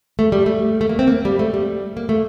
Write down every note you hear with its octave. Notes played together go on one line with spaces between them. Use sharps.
A3
G3
A3
A3
A#3
C4
A#3
G3
A3
G3
A#3
A3